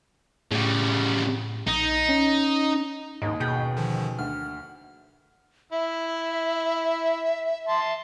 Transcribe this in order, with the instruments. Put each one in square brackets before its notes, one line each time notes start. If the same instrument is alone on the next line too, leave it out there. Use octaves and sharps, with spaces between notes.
[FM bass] A2 [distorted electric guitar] C#3 G3
[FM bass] A#1 [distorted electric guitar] D#4
[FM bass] C#4
[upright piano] D#2 D#4 [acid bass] G#2
[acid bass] B2 [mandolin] C#4 G#4 G5
[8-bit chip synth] D3 D#3 F3
[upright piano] D2 [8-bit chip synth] F6
[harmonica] E4 [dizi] E5
[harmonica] A5 C6